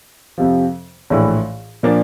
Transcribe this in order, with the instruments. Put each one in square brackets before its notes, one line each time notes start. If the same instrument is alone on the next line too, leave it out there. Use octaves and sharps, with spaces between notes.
[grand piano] F2 C3 F3
A#1 A2 E3
A#2 F3 A#3 D4